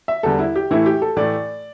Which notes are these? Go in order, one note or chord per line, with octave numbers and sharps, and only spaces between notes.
E5
E2 D3 G3 A4
E4
G4
A2 E3 A3 E4
G4
A4
A2 E3 A3 D5